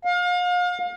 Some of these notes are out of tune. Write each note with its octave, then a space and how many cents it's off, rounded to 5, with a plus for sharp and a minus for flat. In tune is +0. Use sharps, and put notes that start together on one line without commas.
F5 +35